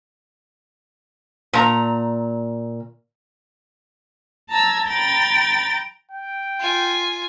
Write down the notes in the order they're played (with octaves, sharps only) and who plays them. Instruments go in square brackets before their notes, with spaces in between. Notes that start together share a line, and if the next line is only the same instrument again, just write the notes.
[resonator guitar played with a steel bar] A#2 A#5
[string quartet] A5 A#5 E6 G#6
G5 A#5 B5 A6
[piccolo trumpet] G5
[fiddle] F4 G#5